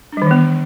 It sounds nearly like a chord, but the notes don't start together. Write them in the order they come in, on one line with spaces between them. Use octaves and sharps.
D4 G3 D#3 E3 B3